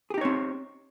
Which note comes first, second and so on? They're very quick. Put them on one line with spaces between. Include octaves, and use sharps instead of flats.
G#4 G4 D#4 C#5 C4